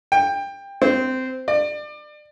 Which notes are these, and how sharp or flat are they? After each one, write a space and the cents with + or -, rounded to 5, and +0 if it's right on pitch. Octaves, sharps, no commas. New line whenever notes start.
G5 +20
C4 -15
D5 +30